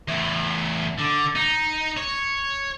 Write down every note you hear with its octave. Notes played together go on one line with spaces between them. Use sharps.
E2 A2
D3
D#4
C#5